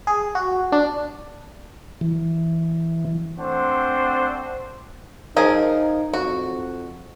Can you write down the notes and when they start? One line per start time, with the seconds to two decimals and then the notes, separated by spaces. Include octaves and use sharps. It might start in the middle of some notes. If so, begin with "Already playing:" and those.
0.07 G#4
0.35 F#4
0.72 D4
2.01 E3
3.38 A3 C4 D4 C5 D5 F#5
5.36 F3 D#4 G#4 A#4
6.14 F2 F#4